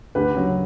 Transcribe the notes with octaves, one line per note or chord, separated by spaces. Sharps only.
D2 G4 B4
C#3 F#3